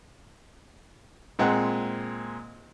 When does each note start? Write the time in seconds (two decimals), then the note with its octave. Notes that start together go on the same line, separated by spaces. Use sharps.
1.39 A#2 G#3 C4 F#5